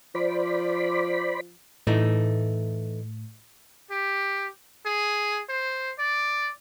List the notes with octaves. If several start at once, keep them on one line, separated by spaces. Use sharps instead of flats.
F3 C5 D5 B5
A2 E3 A3 D#4
G4
G#4
C5
D5